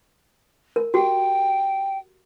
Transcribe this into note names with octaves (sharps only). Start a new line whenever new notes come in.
A#4
F#4 G4 G5